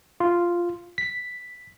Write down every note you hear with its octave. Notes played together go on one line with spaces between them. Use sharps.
F4
B6